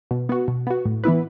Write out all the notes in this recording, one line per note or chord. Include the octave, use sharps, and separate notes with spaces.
B2
B3 F#4
B2
B3 F#4
A2
E3 B3 E4 B4